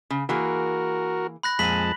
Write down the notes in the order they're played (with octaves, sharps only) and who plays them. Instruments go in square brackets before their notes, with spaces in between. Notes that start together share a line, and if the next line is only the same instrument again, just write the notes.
[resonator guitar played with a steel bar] C#3
[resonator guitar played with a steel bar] E3 A#3 G#4 [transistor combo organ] F#4 A#4
[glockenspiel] B5 F#6 A#6
[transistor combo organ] F2 G#3 A5 [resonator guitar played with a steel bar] A#2 G#5 [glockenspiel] B6 F#7